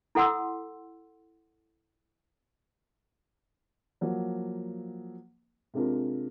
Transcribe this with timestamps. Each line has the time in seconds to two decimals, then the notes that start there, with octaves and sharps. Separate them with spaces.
0.15 E4 A4 F#5 C6 E6
4.01 F3 F#3 A#3
5.74 C3 G#3 D4 F4 A#4